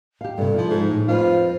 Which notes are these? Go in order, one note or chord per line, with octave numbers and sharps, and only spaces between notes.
G4 F5
G2 C3 A4
F3 E4 F4
G#2 D#4
A2
F2 F4 A4 B4 C5